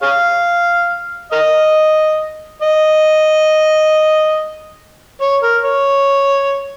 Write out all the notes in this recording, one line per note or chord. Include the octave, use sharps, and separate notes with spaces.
G#4 C#5 F5
A#4 D#5
D#5
C#5
A#4
C#5